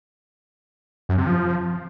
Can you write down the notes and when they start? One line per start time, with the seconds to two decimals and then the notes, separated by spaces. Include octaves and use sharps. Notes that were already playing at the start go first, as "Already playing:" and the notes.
1.09 F#2
1.18 C3
1.27 F3